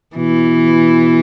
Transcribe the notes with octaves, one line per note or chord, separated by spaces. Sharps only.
B2 E3